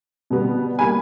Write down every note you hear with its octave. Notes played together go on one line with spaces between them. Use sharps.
B2 G3 B3
G3 A#3 G#5 B5